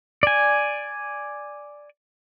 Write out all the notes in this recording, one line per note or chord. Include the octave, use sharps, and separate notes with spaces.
D5 G#5